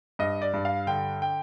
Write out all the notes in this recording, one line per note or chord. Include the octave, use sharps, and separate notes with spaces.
G2 D#5
D5
G2
F5
D3 G5
G5